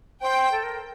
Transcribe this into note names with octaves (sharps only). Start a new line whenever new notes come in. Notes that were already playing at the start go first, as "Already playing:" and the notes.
C5 G5
A4
A#4